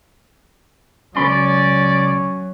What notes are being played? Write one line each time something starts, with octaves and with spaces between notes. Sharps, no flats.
C#2 F#3 C#4 D5 B5 C6